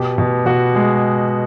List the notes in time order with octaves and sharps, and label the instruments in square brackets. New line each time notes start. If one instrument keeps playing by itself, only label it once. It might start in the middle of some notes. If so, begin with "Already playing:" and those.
Already playing: [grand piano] B2 G4
B2
B2 F#4
G#3